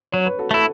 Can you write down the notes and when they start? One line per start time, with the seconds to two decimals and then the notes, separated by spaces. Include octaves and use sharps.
0.12 F#3 C#5
0.26 B4
0.39 F#4 A4
0.51 A3 E4 A4